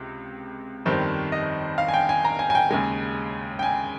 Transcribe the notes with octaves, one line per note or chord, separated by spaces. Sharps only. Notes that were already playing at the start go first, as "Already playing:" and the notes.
Already playing: C#2 C3
G1 F2 D#3 G3 C4 C5
D#5
F5
G#5
G5
G#5
A#5
G#5
G#5
G5
D#2 C#3 G#3 G#5
G5
G#5